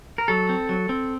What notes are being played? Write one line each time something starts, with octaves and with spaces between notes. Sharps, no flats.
A#4
F#3 A4
C4
F#3
C4